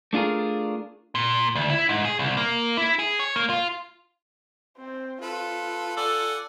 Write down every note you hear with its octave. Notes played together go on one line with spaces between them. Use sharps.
A3 D4 F4 G#4 A#4
A#2
D2
E4
G#2
G#4
C2
A#3
E4
G#4
C#5
A#3
F4
C4
F4 A4 B4
A4 D5 F#5 G#5